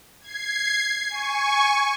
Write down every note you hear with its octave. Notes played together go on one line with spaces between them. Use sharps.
G#6 C7
G#5 C#6